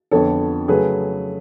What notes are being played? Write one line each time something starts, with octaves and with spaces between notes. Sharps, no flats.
F2 D3 F3 B3 A4 C#5
C#3 F#3 A3 G#4 B4